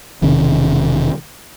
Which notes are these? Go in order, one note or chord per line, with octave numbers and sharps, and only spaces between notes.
E1 C3 D#3 C#4